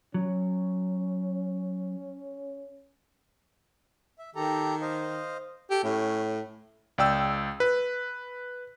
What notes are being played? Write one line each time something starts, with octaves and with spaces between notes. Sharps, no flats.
F#3 C#4
E5
D#3 G4 A4 A#5
C5 D#5 F5
G4 A4
A2 C#4
C#2 D5 G5 E6
B4